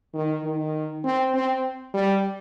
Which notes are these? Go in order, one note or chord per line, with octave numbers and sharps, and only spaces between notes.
D#3
D#3
C4
C4
G3